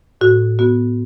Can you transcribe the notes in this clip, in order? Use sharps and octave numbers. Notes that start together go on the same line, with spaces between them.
A2 F#4
B3 F#4